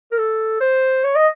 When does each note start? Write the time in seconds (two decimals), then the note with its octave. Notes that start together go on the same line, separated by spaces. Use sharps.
0.12 A#4
0.18 A4
0.61 C5
1.04 C#5
1.16 D#5